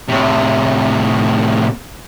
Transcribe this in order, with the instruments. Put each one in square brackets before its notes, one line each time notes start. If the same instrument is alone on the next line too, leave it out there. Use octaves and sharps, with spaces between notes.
[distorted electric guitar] A2 C3